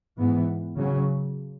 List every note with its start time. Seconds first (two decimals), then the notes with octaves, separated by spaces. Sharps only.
0.18 G#2 E3 B3
0.76 C#3 F#3 C#4